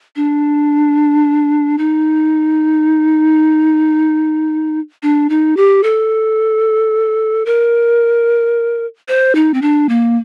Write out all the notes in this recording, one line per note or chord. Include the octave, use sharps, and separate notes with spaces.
D4
D#4
D4
D#4
G4
A4
A#4
C5
D#4
C4
D4
A#3